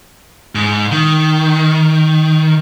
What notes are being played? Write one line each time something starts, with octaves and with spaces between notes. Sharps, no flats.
G#2
D#3